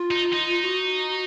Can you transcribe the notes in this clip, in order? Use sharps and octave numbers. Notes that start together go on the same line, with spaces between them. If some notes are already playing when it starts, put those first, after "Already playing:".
Already playing: F4
D#4
D#4
F#4